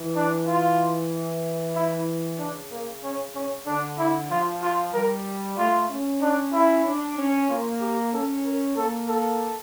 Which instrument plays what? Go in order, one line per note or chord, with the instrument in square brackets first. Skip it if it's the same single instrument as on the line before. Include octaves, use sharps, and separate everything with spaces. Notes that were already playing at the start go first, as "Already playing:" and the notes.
Already playing: [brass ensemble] E3
[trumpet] D4
F4
E4
[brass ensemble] C#3 [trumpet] D4
[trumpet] A#3
C#4
C#4
[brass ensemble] D3 [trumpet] D4
[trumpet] E4
[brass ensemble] F3 [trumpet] F4
[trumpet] F4
[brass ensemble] G3 [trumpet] A#4
[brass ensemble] A3 [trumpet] F4
[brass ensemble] C#4
[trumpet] D4
E4
[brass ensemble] D4
C#4
[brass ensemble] A#3 [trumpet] F4
[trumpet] G4
[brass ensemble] C#4 [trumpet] A4
[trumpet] A#4
[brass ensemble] A#3 [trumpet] A4
[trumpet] A4